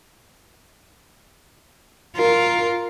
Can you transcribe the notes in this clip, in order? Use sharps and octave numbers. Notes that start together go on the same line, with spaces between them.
F4 A#4